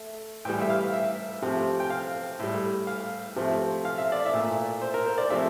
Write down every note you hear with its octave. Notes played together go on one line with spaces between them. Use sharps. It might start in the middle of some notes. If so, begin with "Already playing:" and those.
Already playing: A3
A2 E3 G3 G5
E5
F5
E5
C3 F3 A3
G5
F5
A2 G3
F5
C3 F3 A3
F5
E5
D5
E5
A#2 A3
C5
A#4
C5
D5
C3 F3 A3 E5